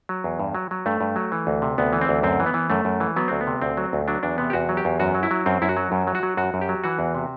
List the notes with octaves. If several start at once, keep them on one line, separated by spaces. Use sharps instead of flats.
F#3
E2
G2
F#3
F#3
G2 A3
G2
F#3
E3
D2
C3
D2 B3
E3
C4
D2
F#2 C4
E3
B3
E3
F#2 A3
F#2
E3
F#3 B3
D2 C4
B3
C3
D2 C4
F#3
D2
F#3 D4
E2 D4
C3 B3
G4
E2 F#4
F#3
G4
E2
F#2 F#4
F#3
E4
F#3
F#2 C4
F#2 E4
F#4
F#3
F#2
F#3
F#4
F#3
F#2 F#4
F#2
G4
F#3
E3 F#4
E2
C3